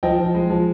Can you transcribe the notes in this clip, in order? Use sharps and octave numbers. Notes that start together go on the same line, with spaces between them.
F3 D#5 G5
F3
G#3
F3